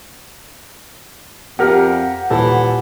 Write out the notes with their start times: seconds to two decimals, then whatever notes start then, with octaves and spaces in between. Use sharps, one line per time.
1.59 F2 G4 A#4 F#5 F6
2.30 D#1 E3 A4